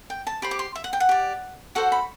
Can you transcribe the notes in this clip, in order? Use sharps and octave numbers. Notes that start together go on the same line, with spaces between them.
G5
A5
G4 C5 B5
D6
C6
E5
F#5
G5
F#5
G4 D5
F#4 A4 C5 F#5
B5